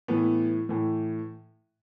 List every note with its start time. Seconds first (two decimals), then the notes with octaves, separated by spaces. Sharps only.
0.08 A2 E3 B3
0.69 A2 E3